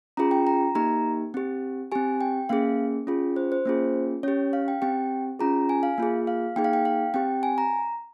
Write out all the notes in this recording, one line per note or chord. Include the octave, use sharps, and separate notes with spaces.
C#4 F4 G#4 A#5
G5
A#5
A#3 D#4 G4 A#5
C4 G4
C4 G4 G#5
G5
A#3 C#4 G#4 F5
C#4 F4 G#4
C5
C5
A#3 C#4 F4 G#4
C#4 G4 C#5
F5
G5
C4 G4 G5
C#4 F4 G#4 A#5
G#5
F5
A#3 F4 G#4
F5
A#3 D#4 G#4 G5
F5
G5
F5
C4 G4 G5
G#5
A#5